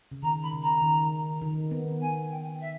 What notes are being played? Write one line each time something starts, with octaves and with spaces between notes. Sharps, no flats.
C#3
D#3 A#5
B5
C#3
A#5
D#3
D#3
B3
G#5
G5
E5